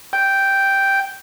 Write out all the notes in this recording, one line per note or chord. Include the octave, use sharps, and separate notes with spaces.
G5